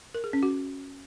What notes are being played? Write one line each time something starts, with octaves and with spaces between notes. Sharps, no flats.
A#4
G#4
C#4
F#4